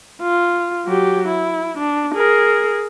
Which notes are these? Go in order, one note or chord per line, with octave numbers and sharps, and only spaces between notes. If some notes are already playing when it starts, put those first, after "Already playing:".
F4
F#3 G4
E4
D4
G#4 A#4